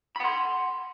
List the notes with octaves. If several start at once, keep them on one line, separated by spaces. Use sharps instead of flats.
F#5 B5 C6